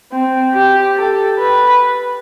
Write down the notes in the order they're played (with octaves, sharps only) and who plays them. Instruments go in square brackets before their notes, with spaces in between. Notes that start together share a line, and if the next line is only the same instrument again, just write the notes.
[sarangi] C4
G4
A4
B4